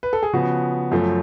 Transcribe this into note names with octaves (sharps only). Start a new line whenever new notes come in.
B4
A4
G#4
C#3 F3 B3 F#4
F#2 F3 A3